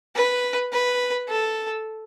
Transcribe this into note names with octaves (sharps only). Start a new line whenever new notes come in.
B4
B4
A4